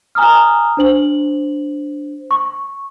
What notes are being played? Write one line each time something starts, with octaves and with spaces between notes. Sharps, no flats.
G#5 A#5 D#6 F6
D4 C5 F#7
C#6